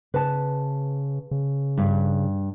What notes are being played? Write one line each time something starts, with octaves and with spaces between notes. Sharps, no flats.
C#3 B4 A5
C#3
G2